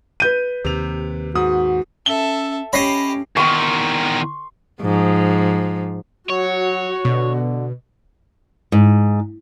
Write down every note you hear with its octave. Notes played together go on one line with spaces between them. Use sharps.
B4 G6 D#7
D#2 C3 F7
G#2 F#4 D#6
C#4 A4 E5 G7
C#4 G4 C#5 D#5 B5 A#6 C7
E2 D#3 C6 C#6
G#2 F3
F#3 F#4 C#5
B2 D3
G#2